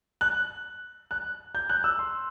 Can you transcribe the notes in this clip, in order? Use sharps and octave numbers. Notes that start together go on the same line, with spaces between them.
F#6
F#6
G6
F#6
E6
C6